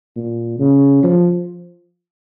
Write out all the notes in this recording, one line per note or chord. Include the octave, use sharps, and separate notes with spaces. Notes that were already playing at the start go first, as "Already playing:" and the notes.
A#2
C#3
F3